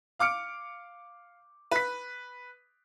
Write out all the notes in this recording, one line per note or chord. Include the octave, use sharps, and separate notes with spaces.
F5 D6 F6 C#7 D7
B4 B6